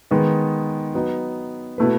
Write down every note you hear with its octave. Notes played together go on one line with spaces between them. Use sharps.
D#3 G#3 B3
F#3 B3 D#4
B2 A3 E4 B4